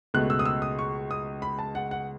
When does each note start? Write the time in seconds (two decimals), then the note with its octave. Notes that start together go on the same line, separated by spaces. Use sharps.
0.14 C#2 B2 A3 F#6
0.30 E6
0.39 D#6
0.45 E6
0.62 D#6
0.79 C#6
1.11 D#6
1.42 B5
1.59 A5
1.75 F#5
1.91 F#5